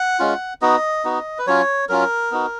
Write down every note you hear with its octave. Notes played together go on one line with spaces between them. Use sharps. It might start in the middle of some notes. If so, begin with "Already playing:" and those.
Already playing: F#5
G#3 C#4 F4
B3 D#4 F#4 D#5
B3 D#4 F#4
B4
F#3 C#4 F4 C#5
F#3 C#4 F4 A#4
B3 D#4 F#4